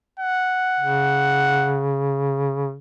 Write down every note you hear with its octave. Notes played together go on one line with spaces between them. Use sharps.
F#5
C#3